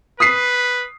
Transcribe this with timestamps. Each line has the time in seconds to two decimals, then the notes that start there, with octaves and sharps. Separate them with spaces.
0.20 B4 D#6 B6 C7